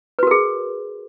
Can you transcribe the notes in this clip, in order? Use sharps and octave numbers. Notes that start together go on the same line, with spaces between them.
F#4 G#4 A#4 B4